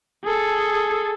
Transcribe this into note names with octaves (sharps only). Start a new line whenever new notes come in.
G#4 A4